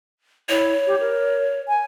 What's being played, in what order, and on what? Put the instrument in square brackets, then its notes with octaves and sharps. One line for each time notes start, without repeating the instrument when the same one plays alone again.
[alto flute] E4 [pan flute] C#5
[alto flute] G4
A#4
G#5